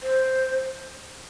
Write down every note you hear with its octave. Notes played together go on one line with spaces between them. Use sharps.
C5